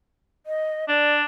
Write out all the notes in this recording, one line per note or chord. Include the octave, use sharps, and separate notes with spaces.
D#5
D4 D5